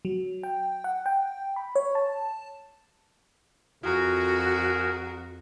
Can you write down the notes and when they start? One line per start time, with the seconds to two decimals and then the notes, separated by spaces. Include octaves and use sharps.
0.05 F#3
0.43 G5
0.84 F#5
1.06 G5
1.56 B5
1.75 C#5
1.95 A5
3.84 F2 F#4 G#4 A#4